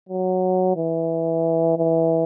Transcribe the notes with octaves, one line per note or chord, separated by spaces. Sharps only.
F#3
E3
E3